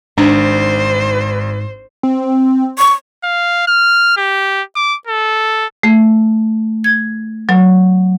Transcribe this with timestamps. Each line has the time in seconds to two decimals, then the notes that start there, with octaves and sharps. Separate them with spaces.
0.18 G#1 G#2 D4 C5
2.03 C4
2.79 C#6
3.24 F5
3.67 F6
4.17 G4
4.76 D6
5.07 A4
5.83 A3
6.84 G#6
7.49 F#3